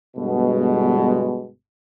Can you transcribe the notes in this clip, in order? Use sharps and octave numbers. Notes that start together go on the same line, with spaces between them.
G1 B2 G#3